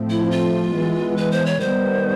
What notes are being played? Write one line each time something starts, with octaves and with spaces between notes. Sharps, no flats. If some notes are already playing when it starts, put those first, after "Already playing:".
Already playing: A2 F3 A3 C4
E4
F4
E3 G#3 B3
B4
C5
C#5
D#3 G3 B3 C5